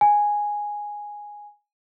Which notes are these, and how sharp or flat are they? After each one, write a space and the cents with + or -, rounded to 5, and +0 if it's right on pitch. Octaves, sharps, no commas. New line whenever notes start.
G#5 -5